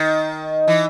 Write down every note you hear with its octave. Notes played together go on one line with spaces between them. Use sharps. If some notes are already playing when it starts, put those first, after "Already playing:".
Already playing: D#3
E3